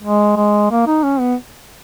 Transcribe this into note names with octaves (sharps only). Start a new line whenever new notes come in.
G#3
G#3
A#3
D#4
C#4
B3